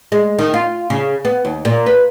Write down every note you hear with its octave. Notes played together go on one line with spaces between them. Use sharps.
G#3
D#3
F4
C#3
B3
D#2
A#2
B4